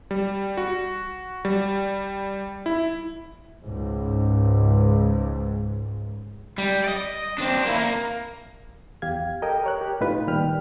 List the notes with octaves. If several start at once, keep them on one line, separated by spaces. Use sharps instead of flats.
G3
F#4
G3
E4
C#2 G#2
G3
D5 D#5
C4 D4
A#3 E4
A#3
E2 G4 F5 G#6
G4 A4 A#4 D#5 G5
A#4 C#5 F#6
G4
A2 D#4 F4 B4
A#2 D#3 G3 G5 B5 F6